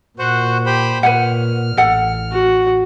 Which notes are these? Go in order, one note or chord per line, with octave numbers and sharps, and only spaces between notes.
A#2 F#4 C5 F#5
G4 C5 B5
A#2 B4 C#5 F#5 F6
A1 A4 F#5
F#4